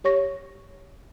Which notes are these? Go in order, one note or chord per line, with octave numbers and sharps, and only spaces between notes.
G4 C#5 C#6 A#6